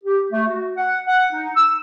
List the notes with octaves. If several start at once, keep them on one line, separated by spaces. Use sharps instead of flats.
G4
A3
F#4
F#5
F#5
D#4
E6